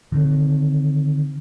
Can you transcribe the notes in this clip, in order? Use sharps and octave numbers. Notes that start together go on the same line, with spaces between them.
D3 D#3 C4